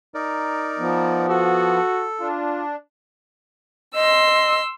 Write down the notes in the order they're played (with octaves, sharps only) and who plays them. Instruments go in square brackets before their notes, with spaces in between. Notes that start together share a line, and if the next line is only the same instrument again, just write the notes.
[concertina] D#4 A#4 D5
[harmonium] F3 B3
[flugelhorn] F#4 [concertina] A4
[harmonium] D4 [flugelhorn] F4
[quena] D#5 [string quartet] C6 E6